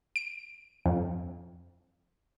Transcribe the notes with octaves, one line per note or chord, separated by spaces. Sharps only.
D7
F2